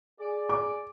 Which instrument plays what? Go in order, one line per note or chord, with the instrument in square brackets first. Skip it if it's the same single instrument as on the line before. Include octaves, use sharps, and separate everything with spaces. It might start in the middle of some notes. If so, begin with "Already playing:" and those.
[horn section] G#4 D5
[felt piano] D6